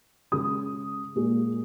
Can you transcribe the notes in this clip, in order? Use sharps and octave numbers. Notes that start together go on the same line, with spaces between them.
C#3 G#3 D#6
A#2 G#3